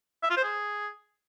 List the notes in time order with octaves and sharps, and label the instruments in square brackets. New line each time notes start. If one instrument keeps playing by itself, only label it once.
[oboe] E5
F4
C5
G#4